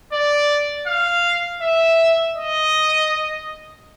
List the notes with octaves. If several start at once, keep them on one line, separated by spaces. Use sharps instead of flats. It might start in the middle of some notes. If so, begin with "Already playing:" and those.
D5
F5
E5
D#5